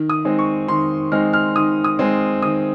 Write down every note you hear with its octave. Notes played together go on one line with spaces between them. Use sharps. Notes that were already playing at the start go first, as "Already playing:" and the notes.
Already playing: D#3
D#6
G#3 C4 D#4
C#6
D#3 C6
G#3 C4 D#4 F6
F6
D#3 D#6
D#6
G#3 C4 D#4
D#3 D#6